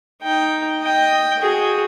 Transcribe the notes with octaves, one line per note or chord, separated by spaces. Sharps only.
D#4 G5
D#5 G5
F#4 G#4